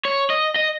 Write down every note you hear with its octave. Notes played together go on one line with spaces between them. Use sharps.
C#5
D#5
D#5